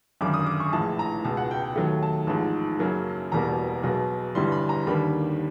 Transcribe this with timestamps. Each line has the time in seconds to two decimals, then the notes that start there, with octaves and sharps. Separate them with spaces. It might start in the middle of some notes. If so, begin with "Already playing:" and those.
0.21 G#1 F#2 D3 D6
0.34 D#6
0.46 D6
0.60 C#6
0.73 A#1 A2 E3 G#3 A5
0.99 A#5
1.24 C#2 B2 G#3 A5
1.37 F#5
1.51 G5
1.63 G5
1.76 D#2 D#3 F#3 A3
2.03 A5
2.27 A1 G#2 F3 A5
2.79 F#2 C#3 F#3 A#3
3.32 E1 E2 B2 G3 A#3 A#5
3.82 B1 B2 G#3
4.35 G1 G2 E3 G3 C6
4.52 B5
4.69 A#5
4.87 D#2 D3 G3 A#3 B5